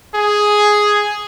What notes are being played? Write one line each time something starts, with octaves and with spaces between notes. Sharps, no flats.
G#4